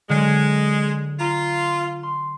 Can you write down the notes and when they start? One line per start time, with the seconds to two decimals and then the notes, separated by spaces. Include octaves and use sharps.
0.09 D3 F#3 G#3
1.20 F4 A#5
2.03 C6